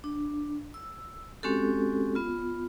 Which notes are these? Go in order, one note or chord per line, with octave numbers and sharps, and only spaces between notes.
D4
E6
G#3 C4 C#4 F#4 G4 A4
B3 F4